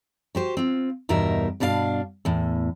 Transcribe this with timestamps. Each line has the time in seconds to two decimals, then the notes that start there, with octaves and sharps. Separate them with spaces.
0.35 F#4 G4 C5
0.57 C4 F4
1.09 E2 G2 B2 D#4 A#4 E5
1.60 G2 B2 D4 G#4 F5
2.25 E2 A2